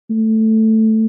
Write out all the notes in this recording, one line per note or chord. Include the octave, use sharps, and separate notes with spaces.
A3